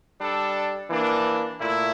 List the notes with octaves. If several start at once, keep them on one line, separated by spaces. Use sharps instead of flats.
G3 D4 A4
E3 A#3 D4
A#2 A3 E4